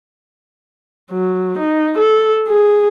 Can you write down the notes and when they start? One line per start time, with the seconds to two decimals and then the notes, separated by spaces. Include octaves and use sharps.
1.11 F#3
1.58 D#4
1.98 A4
2.48 G#4